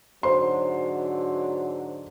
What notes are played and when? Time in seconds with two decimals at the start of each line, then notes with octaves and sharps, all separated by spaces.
0.23 G#2 D3 F#3 C5 C6